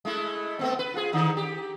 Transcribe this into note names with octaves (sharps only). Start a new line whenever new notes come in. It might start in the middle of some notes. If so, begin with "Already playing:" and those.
G#3 A3 E4
A3 B3 C4
B4
F4 G#4
D3 D#3 D#4
G4